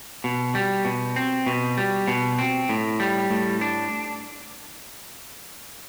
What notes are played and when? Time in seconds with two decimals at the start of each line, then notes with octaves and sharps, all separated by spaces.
0.24 B2
0.55 G3
0.85 B2
1.16 C4
1.46 B2
1.77 G3
2.08 B2
2.38 C4
2.69 A2
3.00 G3
3.31 A2
3.61 D4